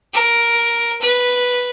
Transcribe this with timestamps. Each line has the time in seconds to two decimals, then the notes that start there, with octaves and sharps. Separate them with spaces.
0.13 A#4
1.01 B4